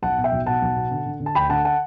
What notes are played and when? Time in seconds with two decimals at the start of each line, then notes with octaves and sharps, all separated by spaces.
0.02 B1 F#5 A5
0.18 B2
0.24 E5 G5
0.32 B1
0.46 B2 F#5 A5
0.62 B1
0.76 B2
0.91 D3
1.06 D3
1.20 D3
1.26 A5
1.35 D2 G5 B5
1.50 D3 F#5 A5
1.65 F#5 A5